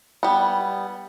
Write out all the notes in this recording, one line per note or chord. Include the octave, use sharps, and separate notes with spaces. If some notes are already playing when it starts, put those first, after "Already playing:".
G3 B3